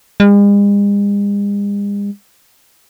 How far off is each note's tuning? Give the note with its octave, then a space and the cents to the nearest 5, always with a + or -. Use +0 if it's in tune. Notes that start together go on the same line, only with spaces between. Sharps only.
G#3 -45